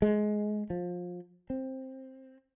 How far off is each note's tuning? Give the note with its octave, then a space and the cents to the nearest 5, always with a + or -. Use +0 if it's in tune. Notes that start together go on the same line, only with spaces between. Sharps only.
G#3 +20
F3 +25
C4 +10